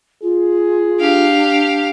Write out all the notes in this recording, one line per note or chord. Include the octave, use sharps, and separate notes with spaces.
F4 G#4
D4 G4 F5